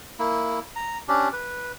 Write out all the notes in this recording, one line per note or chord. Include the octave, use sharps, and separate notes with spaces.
A#3 E4
A#5
C#4 D4 G4
B4